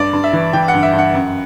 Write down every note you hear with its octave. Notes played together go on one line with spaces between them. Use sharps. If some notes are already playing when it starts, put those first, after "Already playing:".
Already playing: G2 D5
G2
E5
E3
E3 G5
F#5
G2
E5
G2
F#5
F#2